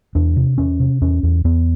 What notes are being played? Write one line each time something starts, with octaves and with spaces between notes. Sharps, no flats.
E2 D4
C3
E2 C#4
C3
E2 C#4
E2
E2 B3